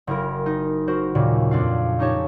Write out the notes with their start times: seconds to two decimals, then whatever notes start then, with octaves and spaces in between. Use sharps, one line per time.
0.07 F#1 E4 A#4
0.46 D#4
0.88 F#4 A#4 C5
1.15 D#2 A#2 C#3
1.51 F2 D4 F5
1.99 C#4 D#4 G4 C#5 A5